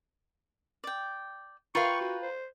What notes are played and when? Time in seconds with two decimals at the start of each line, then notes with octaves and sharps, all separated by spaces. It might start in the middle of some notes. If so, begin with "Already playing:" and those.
0.84 D5 G5
1.75 F4 A#4 B4 F5 G5 C#6
2.01 F#4
2.22 C5